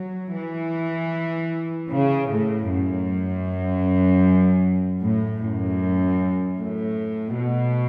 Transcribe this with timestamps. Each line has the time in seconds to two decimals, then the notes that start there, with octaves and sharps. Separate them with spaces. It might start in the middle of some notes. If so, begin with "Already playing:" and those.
Already playing: F#3
0.37 E3
1.92 C#3
2.31 A2
2.70 F#2
5.03 A2
5.42 F#2
6.59 A2
7.37 B2